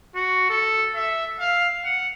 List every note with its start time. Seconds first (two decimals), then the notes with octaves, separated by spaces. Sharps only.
0.15 F#4
0.49 A4
0.96 E5
1.39 F5
1.84 F#5